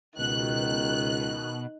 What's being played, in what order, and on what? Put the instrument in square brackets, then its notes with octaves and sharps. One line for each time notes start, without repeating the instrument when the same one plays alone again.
[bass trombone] C#2 [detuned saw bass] B2 [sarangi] D#3 [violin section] F#6